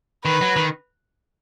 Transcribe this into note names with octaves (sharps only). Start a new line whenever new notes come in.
D#3 B4
F#3
D#3